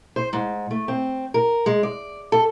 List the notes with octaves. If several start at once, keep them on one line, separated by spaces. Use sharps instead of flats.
C5
G#2
A3
C4
A#4
G#3
D5
A4